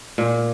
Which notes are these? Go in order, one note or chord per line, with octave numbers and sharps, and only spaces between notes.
A#2